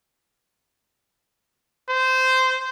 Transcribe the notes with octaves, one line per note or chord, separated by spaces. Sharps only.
C5